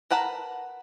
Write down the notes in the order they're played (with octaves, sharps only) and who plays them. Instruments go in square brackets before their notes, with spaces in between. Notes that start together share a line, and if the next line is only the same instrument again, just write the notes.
[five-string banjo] A#4 B4 F#5 A5 A#5